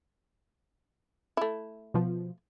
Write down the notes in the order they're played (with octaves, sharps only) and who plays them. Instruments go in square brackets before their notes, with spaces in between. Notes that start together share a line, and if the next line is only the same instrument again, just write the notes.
[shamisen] A3 E4
[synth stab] B2 F3